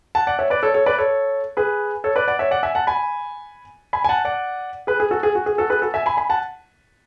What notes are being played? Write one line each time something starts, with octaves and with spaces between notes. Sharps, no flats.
F#5 A5
D5 F#5
C#5 E5
B4 D5
A4 C#5
A4 C#5
B4 D5
A4 C#5
G#4 B4
A4 C#5
B4 D5
D5 F#5
C#5 E5
D5 F#5
E5 G#5
F#5 A5
G#5 B5
G#5 B5
G#5
F#5 A5
D5 F#5
G#4 B4
G#4
F#4 A4
G#4
F#4
G#4
F#4 A4
G#4 B4
F#4 A4
E5 G#5
G#5 B5
G#5 B5
F#5 A5